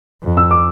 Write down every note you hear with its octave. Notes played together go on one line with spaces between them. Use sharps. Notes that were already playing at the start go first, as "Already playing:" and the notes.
F2
E6
D6